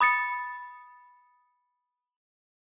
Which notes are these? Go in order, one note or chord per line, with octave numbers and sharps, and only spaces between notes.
B5 D#6 A6 C#7